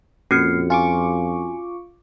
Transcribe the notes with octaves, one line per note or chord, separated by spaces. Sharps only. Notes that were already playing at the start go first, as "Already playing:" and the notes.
F2 A#2 C#4 F#4 F6 C7 C#7
F4 G#5 C#6 D6